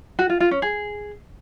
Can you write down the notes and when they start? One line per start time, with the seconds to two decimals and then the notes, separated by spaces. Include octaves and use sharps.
0.19 F#4
0.30 F4
0.40 F4
0.51 C#4
0.62 G#4